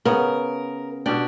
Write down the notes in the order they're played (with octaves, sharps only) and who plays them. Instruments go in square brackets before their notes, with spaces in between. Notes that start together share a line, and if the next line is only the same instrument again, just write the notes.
[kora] C#3 B3 [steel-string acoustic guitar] A#4
[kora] B2 G4 G5 [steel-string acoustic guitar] D4